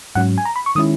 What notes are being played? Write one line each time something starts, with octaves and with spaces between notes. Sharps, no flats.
G#2 F#3 C#4 F#5
G#5
A#5
B5
C#6
D#3 G#3 C#4 E4 D#6